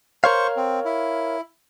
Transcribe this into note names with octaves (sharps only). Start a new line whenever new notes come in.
A#4 C5 C#5 F5 C#6
C4
E4